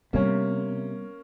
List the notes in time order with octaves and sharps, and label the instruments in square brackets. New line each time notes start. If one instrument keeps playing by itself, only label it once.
[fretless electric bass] C3 [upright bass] G3 B3 [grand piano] A#3 C#4